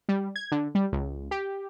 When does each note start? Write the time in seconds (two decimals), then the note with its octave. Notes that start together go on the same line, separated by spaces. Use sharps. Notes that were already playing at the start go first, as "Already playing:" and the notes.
0.09 G3
0.36 G#6
0.52 D3
0.75 G3
0.93 C#2
1.31 G4